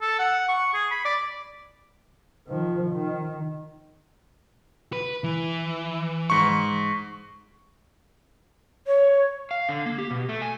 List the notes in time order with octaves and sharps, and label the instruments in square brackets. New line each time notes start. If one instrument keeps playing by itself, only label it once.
[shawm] A4
F#5
C#6
G#4
B5
D5
[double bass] D#3 F3
D#3
[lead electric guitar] B4
E3
[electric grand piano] G#2 C#6
[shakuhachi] C#5
[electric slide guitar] F5
D3
A#3
G4
B2
A3
G#5